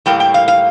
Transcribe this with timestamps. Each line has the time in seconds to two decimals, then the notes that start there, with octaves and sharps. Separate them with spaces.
0.06 A2 G3 A#3 G5
0.20 G5
0.34 F5
0.48 F5